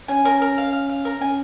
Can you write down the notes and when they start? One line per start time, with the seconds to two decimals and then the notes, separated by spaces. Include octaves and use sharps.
0.08 C#4 G#5
0.25 C#4 A#4
0.42 A#4
0.58 F5
0.73 F5
0.89 F5
1.05 A#4
1.21 C#4 G#5